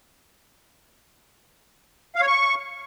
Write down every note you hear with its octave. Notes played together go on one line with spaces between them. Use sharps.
F5
C#5
C#6